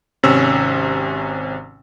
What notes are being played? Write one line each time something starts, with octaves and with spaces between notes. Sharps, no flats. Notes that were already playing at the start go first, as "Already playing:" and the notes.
G#1 C3 C#4 E6